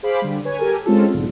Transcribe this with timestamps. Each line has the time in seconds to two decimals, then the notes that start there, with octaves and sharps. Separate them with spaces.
0.03 G#4 C5 F5 B5 D6
0.22 D3 G3
0.45 B4 C#5 G#5
0.57 G4 A4 A#4 G#5
0.86 G#3 C4 C#4 F4 A4
1.14 B1 G#2 D3